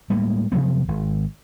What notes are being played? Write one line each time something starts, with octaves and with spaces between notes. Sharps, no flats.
A2 G3 G#3 A#3
C3 F3 F#3 B3
G#1